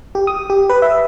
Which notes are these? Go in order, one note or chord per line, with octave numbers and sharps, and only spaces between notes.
G4
D#6
G4
B4
E5